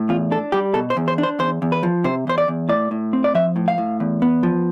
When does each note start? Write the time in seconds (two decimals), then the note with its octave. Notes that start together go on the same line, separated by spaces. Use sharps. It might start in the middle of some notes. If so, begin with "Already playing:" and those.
Already playing: A2
0.09 E2 F4
0.31 D4 A4
0.52 G3 G4
0.74 B2 A4
0.90 C5
0.97 E2
1.08 C5
1.18 D4
1.23 C5
1.39 E2 C5
1.62 E2
1.72 B4
1.83 F3
2.04 C3 C5
2.27 E2 C5
2.38 D5
2.48 E2
2.69 A2 D5
2.91 A2
3.13 C4
3.24 D5
3.35 F3 E5
3.56 A2
3.68 F5
3.78 A2
4.00 E2
4.22 B3
4.43 F3